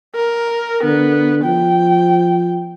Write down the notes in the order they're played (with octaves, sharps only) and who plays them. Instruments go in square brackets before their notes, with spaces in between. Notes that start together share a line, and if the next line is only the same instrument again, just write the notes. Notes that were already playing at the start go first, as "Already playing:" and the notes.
[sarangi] A#4
[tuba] D3 [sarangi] B3
[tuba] F3 [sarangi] G5